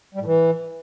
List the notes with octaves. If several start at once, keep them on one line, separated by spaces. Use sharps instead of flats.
G3
A2
E3